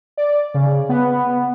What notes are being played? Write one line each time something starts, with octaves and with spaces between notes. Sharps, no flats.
D5
C#3
B3